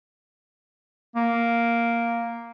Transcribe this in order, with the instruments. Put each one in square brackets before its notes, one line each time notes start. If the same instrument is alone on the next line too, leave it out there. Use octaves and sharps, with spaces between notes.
[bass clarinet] A#3